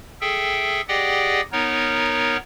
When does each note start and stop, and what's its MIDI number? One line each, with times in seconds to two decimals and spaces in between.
0.21 0.81 68
0.21 0.81 69
0.21 0.81 76
0.21 0.81 79
0.88 1.41 67
0.88 1.41 68
0.88 1.41 74
0.88 1.41 75
0.88 1.41 78
0.88 1.41 79
1.52 2.37 59
1.52 2.37 63
1.52 2.37 70
1.52 2.37 73